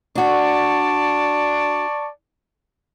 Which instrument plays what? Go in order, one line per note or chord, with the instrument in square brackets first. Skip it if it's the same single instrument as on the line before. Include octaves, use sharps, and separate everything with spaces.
[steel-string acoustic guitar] D4 F#4 [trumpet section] D5 A5 C#6